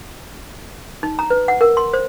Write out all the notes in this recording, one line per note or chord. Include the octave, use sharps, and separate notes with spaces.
D#4
A#5
B4
F#5
A#4
C6
C5